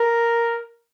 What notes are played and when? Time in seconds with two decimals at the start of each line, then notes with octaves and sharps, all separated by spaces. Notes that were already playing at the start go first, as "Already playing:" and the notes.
Already playing: A#4